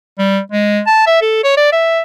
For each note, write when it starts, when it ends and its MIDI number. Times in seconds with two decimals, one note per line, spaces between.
0.19 0.39 55
0.52 0.81 56
0.87 1.06 81
1.07 1.17 76
1.22 1.42 69
1.44 1.54 73
1.57 1.68 74
1.73 2.02 76